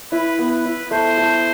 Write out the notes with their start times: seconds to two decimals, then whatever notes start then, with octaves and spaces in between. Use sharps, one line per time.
0.12 E4 B4
0.39 B3
0.52 B4
0.65 E4
0.91 A3 C5
1.18 A3